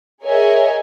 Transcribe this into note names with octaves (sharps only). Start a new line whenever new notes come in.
G#4 A#4 C#5 D#5 E5 G#5